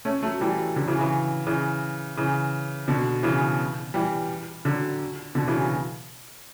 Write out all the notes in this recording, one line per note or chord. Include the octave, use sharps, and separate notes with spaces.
A3 C#4
F#3 A3
E3 G3
D3 F#3
C#3 E3
C#3 E3
C#3 E3
C#3 E3
B2 D3
C#3 E3
E3 G3
D3 F#3
B2 D3
C#3 E3
F#3